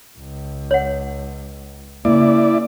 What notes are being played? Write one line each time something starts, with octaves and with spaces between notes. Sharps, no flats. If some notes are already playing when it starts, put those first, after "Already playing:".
C#2
C#5 F#5
C#3 A#3 E4 D5